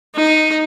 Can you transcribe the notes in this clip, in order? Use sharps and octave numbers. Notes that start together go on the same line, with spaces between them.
D#4